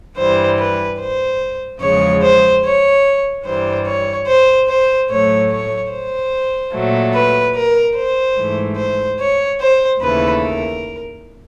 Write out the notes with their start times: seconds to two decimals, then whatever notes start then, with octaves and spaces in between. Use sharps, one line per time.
0.17 G2 E3 G3 C5
0.58 B4
1.00 C5
1.81 E2 C#3 F3 G#3 C#5
2.22 C5
2.63 C#5
3.45 G2 E3 G3 C5
3.86 C#5
4.27 C5
4.68 C5
5.09 A2 F#3 A3 C#5
5.50 C#5
5.91 C5
6.72 A#2 F#3 A3
7.14 B4
7.55 A#4
7.96 C5
8.37 G#2 E3 A3
8.77 C5
9.19 C#5
9.59 C5
10.00 D#2 C#3 E3 A3 B4
10.41 A#4